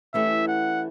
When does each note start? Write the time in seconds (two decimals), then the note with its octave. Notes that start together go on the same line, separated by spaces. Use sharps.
0.14 E3 A3 C#4 E4 G4 E5
0.48 F#5